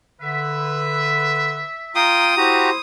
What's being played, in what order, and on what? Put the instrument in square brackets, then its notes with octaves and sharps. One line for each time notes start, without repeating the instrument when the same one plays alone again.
[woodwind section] D3 B4 [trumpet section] E5
[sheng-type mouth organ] F4 G5 C6 [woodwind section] A#5 [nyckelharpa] D#6
[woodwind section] E4 C5 [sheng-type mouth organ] F#4 G4 A#5